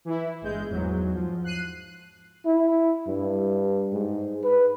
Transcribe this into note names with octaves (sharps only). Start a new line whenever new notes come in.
E3 E4
G1 G#3 G6
E2 G#2 F#3
F3
F#6 C7 D#7
E4
G2
G#2
B4